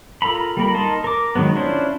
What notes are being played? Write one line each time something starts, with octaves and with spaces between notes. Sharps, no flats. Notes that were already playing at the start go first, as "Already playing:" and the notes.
F4 A4 A#4 A#5 B5
G3 A#3 A#4 B5
D#4 A#4 A5 C6
A#4 D6
D#3 F#3 G#3 B3
C#4 D4 E4 F4 C5